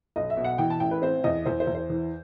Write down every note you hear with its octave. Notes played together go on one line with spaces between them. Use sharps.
B1 D#5
E5
B2
F#5
E3 G5
A5
A1 G5
B4
C4 C5
E2 D#5
E2 C5
C5
E2
C5
E3